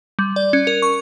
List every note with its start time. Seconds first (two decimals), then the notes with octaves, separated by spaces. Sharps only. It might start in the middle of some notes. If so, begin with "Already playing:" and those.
0.19 G3
0.36 D5
0.53 C#4
0.67 A#4
0.82 C#6